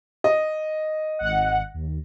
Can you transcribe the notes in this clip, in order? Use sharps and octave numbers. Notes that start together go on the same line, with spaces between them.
D#5
G#1 F#5
D#2